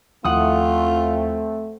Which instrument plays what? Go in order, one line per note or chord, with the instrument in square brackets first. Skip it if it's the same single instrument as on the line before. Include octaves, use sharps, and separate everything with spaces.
[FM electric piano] D#2 F3 E4 [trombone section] A3 C4 [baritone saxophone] F4 [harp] F#5 D#6